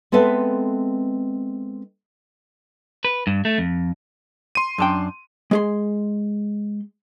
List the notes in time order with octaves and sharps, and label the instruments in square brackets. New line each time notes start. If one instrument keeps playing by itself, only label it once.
[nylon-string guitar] G#3 B3 C4 A4 B4 E5
[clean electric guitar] B4
G2
A3
F2
[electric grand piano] C6 D#7
[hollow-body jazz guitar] F#2 D4 G5
G#3 G#4 C6